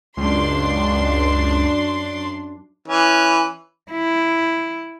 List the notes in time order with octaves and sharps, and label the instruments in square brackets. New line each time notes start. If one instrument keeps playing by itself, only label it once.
[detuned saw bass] C#2 [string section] F#2 D4 C6
[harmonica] E3 C#4
[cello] E4